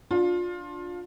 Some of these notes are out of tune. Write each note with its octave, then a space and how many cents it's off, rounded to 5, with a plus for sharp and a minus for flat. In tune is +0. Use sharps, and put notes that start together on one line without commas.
D4 +0 F4 +20